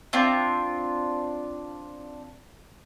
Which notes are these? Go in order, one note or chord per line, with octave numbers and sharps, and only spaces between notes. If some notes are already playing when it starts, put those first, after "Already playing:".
C4 D4 F4